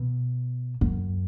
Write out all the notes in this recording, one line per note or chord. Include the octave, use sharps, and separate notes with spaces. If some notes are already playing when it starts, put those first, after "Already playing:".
Already playing: B2
F#2